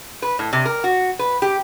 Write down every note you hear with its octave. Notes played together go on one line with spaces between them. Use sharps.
B4
A2
C3
A#4
F#4
B4
G4